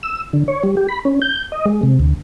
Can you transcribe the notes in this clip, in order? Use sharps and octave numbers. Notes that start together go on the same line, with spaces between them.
E6
D3
C#5
G3
G4
B5
C#4
G6
D#5
G#3
C3
D2